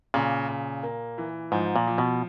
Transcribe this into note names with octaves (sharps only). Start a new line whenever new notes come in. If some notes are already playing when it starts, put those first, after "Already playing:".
A#2 C#3
C#3
A#3
E3
G#2 F3
A#2
F3
B2